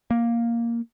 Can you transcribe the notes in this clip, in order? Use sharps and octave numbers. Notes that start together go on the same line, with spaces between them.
A#3